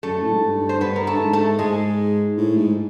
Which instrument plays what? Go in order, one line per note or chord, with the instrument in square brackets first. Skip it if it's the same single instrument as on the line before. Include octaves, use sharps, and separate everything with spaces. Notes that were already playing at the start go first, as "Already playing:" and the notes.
[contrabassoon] F#2 [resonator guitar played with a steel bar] A3 A4
[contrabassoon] A2
G#2
G2
[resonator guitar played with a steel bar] C5
[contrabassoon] G2 [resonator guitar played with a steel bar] B3 B4
[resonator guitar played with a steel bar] A#4
A3 A4
[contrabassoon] G2
G#2
[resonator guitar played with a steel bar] A3 A4
[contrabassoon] G#2 [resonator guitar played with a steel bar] G#3 G#4
[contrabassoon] A2
G#2